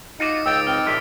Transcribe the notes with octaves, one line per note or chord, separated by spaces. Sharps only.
D#4 F4 F#4 D6 C#7
C#2 G5 D#6 E6 A6 D7
C4 F6
A#1 C3 F3 E5